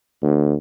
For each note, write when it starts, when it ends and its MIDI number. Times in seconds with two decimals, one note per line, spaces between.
0.23 0.54 38